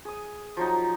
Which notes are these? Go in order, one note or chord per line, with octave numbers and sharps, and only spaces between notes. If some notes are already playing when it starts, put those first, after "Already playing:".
G#4 D#6
F3 F#3 D#4